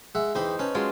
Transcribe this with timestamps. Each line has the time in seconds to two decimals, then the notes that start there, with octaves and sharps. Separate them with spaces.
0.15 G#3 E5 F#5
0.35 E2 D#4 C5 G5 B5
0.59 C#4 B4 A5
0.74 F#3 G#3 F4